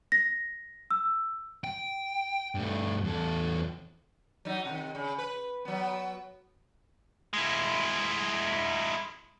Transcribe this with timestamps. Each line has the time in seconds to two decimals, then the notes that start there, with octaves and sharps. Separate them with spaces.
0.12 A#6
0.91 E6
1.64 G5
2.55 G2 A3
3.04 E2 A4
4.45 F#3 D#4
4.65 C3 D#3
4.95 C#3
5.18 B4
5.65 F#3 B3
7.34 G#3 E4